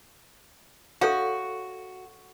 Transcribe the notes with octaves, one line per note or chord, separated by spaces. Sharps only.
F#4 A4 C#5 F5